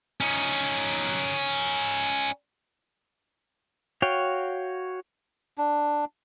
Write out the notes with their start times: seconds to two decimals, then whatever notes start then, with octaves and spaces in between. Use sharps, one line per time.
0.21 C#4 D#4
4.02 F#4 C#5 F5 G5
5.58 D4